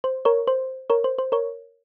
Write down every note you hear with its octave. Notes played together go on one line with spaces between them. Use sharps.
C5
A#4 C#5
C5
A#4 C#5
C5
C5
A#4 C#5